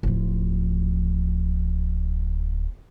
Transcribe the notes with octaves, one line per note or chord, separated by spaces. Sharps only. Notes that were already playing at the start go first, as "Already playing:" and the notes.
D1 F3